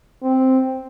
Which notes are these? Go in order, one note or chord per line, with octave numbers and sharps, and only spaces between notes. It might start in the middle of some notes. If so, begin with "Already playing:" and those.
C4